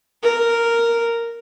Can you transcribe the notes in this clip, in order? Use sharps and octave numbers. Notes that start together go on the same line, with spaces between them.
A#4